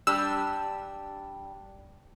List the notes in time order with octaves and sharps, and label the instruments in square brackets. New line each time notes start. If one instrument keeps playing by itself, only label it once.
[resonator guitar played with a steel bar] G3 D4 [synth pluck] E6